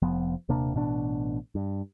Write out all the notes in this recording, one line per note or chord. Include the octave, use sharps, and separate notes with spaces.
F1 F3 B3
D#1 C3 A#3 D4
A1 B2 D3 D4
G2